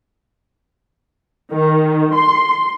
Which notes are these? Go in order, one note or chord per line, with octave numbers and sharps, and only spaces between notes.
D#3
C6